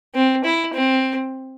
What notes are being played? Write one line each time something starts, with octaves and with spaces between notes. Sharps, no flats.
C4
E4
C4